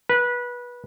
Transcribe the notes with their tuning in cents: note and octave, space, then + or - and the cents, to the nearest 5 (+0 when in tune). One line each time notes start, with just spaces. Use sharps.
B4 -20